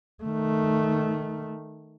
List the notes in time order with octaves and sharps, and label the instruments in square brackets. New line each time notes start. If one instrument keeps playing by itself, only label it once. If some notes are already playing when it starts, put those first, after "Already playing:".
[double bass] D#3 A3